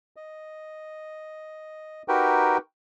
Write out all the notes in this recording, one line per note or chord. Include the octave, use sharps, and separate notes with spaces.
D#5
D#4 F#4 G4 A#4 B4 G5